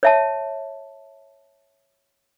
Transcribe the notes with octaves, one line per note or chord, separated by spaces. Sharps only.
C#5 E5 A5